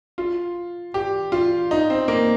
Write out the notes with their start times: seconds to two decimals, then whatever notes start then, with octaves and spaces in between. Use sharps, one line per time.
0.18 F4
0.94 G4
1.32 F4
1.71 D#4
1.90 C4
2.08 A#3